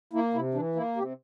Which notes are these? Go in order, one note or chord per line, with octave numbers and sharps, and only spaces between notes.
A#3 E4
C3 E4
E3 D4
A#3 E4
C3 G4